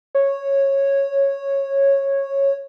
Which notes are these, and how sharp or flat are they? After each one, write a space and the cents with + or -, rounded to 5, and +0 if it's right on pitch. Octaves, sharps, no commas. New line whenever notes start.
C#5 -10